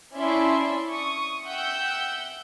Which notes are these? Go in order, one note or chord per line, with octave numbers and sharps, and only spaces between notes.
C#4 D4 E4 D5 E5 C6
C#6 D#6
E5 F#5 G5 E6 G6